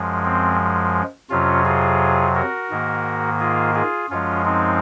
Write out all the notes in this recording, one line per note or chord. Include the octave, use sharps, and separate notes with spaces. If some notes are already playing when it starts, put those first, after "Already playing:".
Already playing: F#2 F3 G#3
C4
F2 C3 F#3 C#4 F4
F4 G#4
F#4 A#4
G#2 D#3 A#3
F4 G#4
F4 G#4
F#2 F3 G#3 C#4 F4
C4 D#4